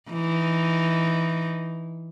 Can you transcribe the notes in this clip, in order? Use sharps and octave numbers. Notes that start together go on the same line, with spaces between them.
E3 D#4